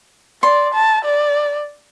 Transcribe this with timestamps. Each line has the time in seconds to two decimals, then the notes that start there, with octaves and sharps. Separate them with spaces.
0.43 D5 C6
0.74 A5
1.05 D5